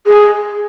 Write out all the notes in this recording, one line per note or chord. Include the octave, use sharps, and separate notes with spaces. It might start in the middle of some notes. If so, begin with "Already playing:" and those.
G#4